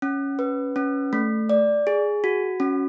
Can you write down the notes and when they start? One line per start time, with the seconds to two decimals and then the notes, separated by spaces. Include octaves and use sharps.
0.02 C#4
0.39 B4
0.76 C#4
1.13 A3
1.49 D5
1.87 G#4
2.24 F#4
2.60 C#4